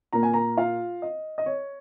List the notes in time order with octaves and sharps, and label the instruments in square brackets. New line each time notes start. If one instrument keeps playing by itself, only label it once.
[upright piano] A#2 A#3 A#5
G#5
A#4 A#5
F4 F5
D#5
D#5
C#5